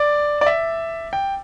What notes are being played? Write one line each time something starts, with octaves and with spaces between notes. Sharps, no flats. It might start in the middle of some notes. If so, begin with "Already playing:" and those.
Already playing: D5
D5
E5
G5